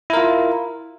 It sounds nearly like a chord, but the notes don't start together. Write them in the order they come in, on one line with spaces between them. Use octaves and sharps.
E4 A#4 F4